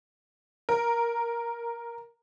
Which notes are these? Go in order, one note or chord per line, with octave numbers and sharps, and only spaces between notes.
A#4